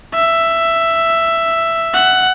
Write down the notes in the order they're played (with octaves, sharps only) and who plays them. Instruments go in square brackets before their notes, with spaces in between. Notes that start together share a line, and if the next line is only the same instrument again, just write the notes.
[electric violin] E5
F#5